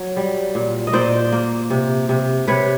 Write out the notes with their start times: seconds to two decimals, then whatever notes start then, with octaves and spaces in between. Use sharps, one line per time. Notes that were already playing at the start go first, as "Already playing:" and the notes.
Already playing: F#3
0.17 G3
0.55 A#2
0.87 D#5
0.93 A#2 C5 D5
1.32 A#3
1.70 C3
2.09 C3
2.47 C3 B4 C#5